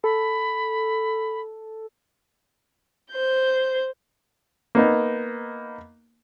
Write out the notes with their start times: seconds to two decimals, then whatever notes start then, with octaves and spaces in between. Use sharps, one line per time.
0.04 A4 B5
3.11 C5 G6
4.75 A#3 B3 D#4